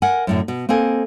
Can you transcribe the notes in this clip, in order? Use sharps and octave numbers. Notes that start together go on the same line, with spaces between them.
A#4 D#5 F#5 G#5
F#2 A2 D3
B2
A#3 C4 A4 D#5 G#5